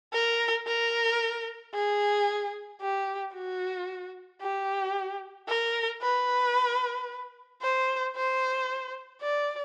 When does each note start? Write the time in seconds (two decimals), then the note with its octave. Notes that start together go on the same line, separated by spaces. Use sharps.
0.13 A#4
0.67 A#4
1.74 G#4
2.81 G4
3.33 F#4
4.41 G4
5.48 A#4
6.01 B4
7.62 C5
8.16 C5
9.22 D5